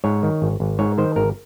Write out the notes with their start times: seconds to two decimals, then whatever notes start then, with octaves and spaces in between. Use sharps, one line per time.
0.04 G#2 C#5
0.23 D#3
0.42 G#1
0.60 G#1
0.79 G#2 C#5
0.98 D#3 C5
1.16 G#1 A#4